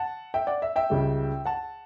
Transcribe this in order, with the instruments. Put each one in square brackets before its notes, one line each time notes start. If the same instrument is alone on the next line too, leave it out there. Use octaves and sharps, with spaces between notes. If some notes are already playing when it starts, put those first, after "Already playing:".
Already playing: [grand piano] F#5 A5
E5 G5
D5 F#5
E5
E5 G5
C#2 C#3 G3
F#5 A5